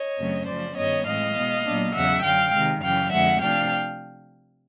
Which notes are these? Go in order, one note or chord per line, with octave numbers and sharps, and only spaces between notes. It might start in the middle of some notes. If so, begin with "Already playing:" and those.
Already playing: C#5 D#5
F#2 C#3 F#3 A3 C4
C#3 F3 A3 C#4 C5 D5
G2 D#3 G3 B3 C#5 D#5
A2 E3 G#3 C4 D#5 F5
B2 G#3 B3
A#2 F#3 B3 D4
E2 C#3 F#3 E5 F#5
F#2 D3 F#3 F5 G5
C3 D#3 G#3
F#2 C#3 E3 F5 G5
F2 D3 F3 G#3 E5 F#5
C3 F3 A3 D4 F5 G5